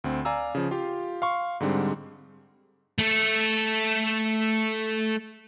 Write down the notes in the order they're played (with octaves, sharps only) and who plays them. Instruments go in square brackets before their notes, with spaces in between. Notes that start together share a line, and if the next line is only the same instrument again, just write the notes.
[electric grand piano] D2 C4
D5 F5 G#5 A#5 E6
C#3 F3
F4 G4 F5
F5 C6 C#6
G#2 D3 G3 G#3 C4
[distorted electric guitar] A3 A4